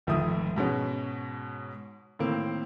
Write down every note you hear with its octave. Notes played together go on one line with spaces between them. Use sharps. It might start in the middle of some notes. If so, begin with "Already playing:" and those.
F1 F2 G#2 D#3 E5 D#6
G#2 B2 G#3 C#4
A2 D#3 A#3 C4